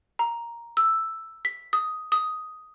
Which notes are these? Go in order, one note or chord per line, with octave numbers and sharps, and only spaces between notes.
A#5
E6
B6
D#6
D#6